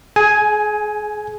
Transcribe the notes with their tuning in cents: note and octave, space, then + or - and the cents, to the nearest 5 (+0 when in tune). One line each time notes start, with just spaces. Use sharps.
G#4 +30 G#5 +0